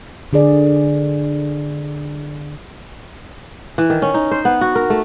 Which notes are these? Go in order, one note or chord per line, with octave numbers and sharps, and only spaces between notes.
D3 G#4 D5
E3
D#3
C#4
D#4
C5
B3
F#4
A#4
A3